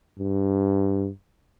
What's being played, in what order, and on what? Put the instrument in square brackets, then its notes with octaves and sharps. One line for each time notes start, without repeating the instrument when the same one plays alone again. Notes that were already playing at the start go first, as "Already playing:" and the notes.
[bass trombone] G2